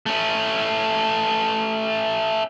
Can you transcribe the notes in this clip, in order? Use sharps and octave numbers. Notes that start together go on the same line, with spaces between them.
A3 C#4